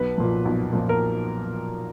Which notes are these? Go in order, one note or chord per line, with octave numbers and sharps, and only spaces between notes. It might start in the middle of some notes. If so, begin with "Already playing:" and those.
Already playing: B1 B4
A#2 F3
B1
A#2 F3
A#4